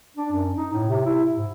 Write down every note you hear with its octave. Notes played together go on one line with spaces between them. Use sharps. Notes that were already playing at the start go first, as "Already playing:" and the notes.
D4
F#2
D#4
A2
C3
E4
G#2